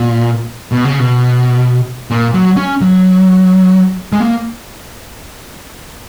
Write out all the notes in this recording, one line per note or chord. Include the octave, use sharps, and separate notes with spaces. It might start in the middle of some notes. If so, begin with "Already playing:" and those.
Already playing: A#2
B2
C#3
B2
A#2
F#3
C#4
F#3
G#3
A#3